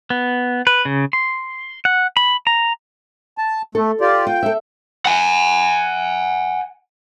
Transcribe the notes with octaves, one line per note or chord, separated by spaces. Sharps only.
B3
B4
C#3
C6
F#5
B5
A#5
A5
A3 A4
F4 G4 D5
F4 G5
A4 E5
F#5 G#5